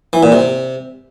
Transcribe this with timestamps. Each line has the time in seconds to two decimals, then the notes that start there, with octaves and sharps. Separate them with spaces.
0.13 E3
0.23 A#2
0.32 C3